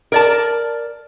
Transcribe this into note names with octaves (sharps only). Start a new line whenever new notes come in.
A#4 D5 A5